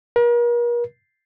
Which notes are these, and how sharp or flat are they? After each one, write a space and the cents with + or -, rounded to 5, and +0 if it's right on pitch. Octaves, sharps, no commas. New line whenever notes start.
A#4 +40